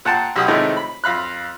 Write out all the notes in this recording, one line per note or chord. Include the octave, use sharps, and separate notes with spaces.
A#2 F#5 G5 A5 C6
B1 G4 B5 D#6
A2 C3 D#3 F3 G#3 A3
B5
F2 F5 B5 F#6